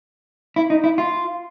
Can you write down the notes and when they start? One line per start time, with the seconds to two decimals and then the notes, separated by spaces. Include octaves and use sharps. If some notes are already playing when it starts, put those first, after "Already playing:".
0.56 E4
0.70 D#4
0.84 E4
0.98 F4